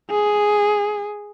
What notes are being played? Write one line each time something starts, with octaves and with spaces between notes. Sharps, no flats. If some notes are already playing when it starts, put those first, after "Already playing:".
G#4